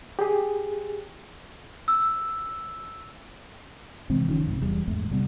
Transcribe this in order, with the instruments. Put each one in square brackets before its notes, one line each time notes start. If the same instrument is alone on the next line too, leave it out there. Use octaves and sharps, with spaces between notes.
[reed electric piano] G4 G#4
[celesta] E6
[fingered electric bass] C3 E3 G#3 C4
F1 D#3 F3 C#4
C2 G#2 C3
E1 E2 G3
A#1 E2 G#2 A3
A#1 C3 G3 B3